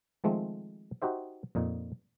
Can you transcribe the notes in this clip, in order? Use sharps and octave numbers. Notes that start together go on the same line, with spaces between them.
D#3 F3 G#3 A3 C4
D#4 F#4 G4 C5 E5
F2 A#2 D#4